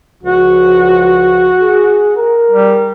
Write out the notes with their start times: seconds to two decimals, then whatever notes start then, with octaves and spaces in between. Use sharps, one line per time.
0.23 C#2 F3 F#4
1.61 G#4
2.17 A#4
2.51 G3